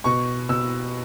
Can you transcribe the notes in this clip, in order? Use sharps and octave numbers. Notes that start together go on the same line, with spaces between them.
B2 C#6
B2 E6